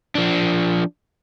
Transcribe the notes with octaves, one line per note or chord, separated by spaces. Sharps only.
F3 D4